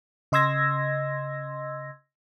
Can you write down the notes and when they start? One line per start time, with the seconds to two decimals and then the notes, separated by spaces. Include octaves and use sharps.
0.32 C#3 D#5 C6 E6 G#6 A#6